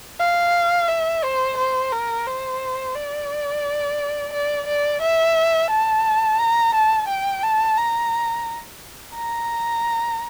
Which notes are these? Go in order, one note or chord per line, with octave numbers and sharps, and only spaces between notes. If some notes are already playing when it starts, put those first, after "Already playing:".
F5
E5
C5
C5
A#4
C5
D5
D5
D5
E5
A5
A#5
A5
G5
A5
A#5
A#5